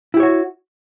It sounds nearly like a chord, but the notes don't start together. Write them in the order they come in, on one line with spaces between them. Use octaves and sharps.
E4 G4 C#5 F#4